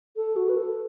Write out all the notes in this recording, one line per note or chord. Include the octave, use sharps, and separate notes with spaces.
A4
F#4
B4
A4